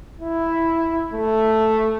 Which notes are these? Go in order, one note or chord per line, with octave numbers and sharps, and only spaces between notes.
E4
A3